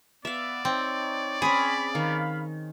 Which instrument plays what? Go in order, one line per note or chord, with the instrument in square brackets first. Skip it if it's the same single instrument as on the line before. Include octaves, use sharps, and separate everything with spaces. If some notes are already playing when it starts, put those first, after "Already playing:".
[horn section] B3 [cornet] D5 [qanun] E5 F5
[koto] C4 [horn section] D#4 C#5
[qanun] C4 C#4 [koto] G#4 [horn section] B5
[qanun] D#3 [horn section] F5 B5